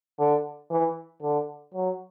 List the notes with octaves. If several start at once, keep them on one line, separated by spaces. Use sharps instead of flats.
D3
E3
D3
F#3